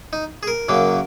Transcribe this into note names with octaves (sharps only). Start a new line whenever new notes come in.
D#4
G#4
A#4
F#2 C#3 F#3 A#3